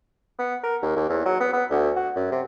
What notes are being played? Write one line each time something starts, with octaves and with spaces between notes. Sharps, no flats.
B3
A#4
D#2
D#2
E2
F#3
B3
B3
D2
F#4
F#2
C3